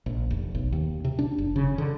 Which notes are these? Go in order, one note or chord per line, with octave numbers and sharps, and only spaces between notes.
A#1
F1
B1
D#2
C3
D4
F#1
C#3
D3